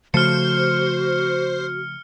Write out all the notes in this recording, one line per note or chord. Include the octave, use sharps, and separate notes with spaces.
C#3 F3 A3 F#4 C5 F6 C#7